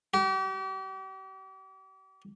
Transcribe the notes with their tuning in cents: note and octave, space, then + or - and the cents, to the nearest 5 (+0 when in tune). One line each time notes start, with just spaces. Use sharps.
G4 -40